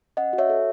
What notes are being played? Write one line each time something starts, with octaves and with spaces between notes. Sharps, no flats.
C#4 D#5 F#5
F#4
C#5 E5
A4